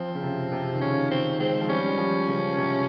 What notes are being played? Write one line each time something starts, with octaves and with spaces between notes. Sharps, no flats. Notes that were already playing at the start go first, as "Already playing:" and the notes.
Already playing: F3 C4
C#3
C3
C3
D#3
C#3 C#4
D#3 C4
G#3 C4
F3
G3 C#4
G3
F3
C#3
C3